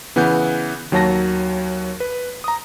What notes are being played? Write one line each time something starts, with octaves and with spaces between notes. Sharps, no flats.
C#3 E3 B3 F#5 F#6 G6
D#2 F#3 C#5 A5 A#6
B4
A#5 D#6